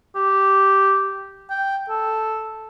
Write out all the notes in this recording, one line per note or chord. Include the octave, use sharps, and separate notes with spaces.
G4
G5
A4